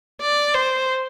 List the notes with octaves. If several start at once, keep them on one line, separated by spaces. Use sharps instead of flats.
D5
C5